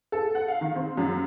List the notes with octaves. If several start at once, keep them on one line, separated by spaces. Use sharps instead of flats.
A4
F#5
F5
D#3
C4
F#2